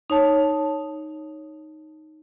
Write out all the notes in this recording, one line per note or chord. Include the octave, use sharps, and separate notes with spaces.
D#4 C#5 A5